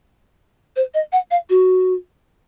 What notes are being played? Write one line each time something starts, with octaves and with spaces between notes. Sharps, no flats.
C5
D#5
F#5
F5
F#4